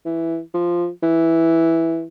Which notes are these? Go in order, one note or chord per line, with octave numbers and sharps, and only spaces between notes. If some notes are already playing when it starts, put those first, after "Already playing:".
E3
F3
E3